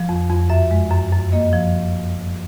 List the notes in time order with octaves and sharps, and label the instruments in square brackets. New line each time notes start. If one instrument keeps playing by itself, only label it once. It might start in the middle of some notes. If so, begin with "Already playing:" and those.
Already playing: [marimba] F3
F2
F2
F#2 E5
G#3
F#2
F#2
A#3 D#5
F3